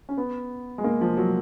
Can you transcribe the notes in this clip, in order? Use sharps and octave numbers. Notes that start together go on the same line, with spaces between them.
C#4
B3
G#3
A#3
F3
F#3